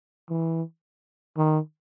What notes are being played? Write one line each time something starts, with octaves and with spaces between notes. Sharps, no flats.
E3
D#3